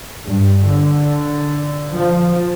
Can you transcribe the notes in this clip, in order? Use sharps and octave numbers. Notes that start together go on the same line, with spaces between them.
G2
D3
F3